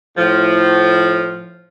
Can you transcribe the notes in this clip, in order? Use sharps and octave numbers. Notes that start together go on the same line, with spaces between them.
A2 F3